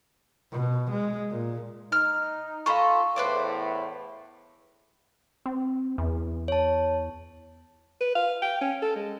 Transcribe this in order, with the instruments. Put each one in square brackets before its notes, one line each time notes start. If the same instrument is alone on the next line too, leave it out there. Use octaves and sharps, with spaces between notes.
[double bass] B2
G#3
A#2
[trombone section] D#4 [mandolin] F6
[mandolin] F4 A4 D#5 [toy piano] F5 B5 C#6
[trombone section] E2 A2 [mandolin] B4 C5 D5
[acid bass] C4
E2
[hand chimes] C#5 A5
[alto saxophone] B4
F5
G5
C#4
A4
G#3